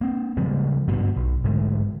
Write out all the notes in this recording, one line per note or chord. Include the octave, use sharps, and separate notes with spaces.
A#3 C4
C#3 F3 G3 G#3
G#1 G2 B2
B1
G#2 D3 G#3 A3